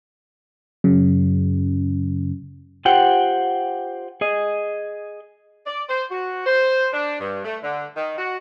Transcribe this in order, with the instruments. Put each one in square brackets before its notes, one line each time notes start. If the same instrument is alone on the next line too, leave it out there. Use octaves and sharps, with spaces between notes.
[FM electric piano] F#2 C#3
[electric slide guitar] F4 G4 C5 F#5 G5
G#4 D#5
[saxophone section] D5
C5
F#4
C5
D4
G2
A3
D3
D#3
F#4